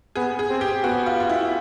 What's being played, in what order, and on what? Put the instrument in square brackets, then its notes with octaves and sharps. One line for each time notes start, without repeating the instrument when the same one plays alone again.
[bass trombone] B3 [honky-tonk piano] G#4
[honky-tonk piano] G#4
[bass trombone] C4
[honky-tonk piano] G4
[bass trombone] B3 [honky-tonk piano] F#4
[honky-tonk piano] F4
F4
E4